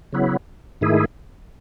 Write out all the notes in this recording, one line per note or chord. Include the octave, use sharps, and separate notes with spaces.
C#3 F#3 B3 E4
G#2 D#3 A3 E4 G#4